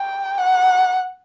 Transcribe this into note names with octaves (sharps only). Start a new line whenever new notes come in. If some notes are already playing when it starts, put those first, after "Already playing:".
Already playing: G5
F#5